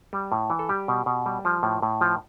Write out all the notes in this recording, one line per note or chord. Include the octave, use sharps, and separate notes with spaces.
G3
A2
E3
A4
G3 G4
B2
B2
G3
F3
A2
A2
F3